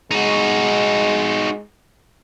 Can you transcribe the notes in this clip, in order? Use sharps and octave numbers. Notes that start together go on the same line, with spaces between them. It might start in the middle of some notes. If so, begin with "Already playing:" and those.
G#3 D#4 F#4